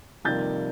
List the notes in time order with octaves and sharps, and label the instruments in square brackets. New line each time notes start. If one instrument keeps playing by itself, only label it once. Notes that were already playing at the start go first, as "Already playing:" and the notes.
[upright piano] F2 C3 D#3 G3 A#3 G6 A6